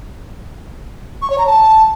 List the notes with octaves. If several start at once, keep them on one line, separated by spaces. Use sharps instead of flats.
C#6
C#5
A#5
A5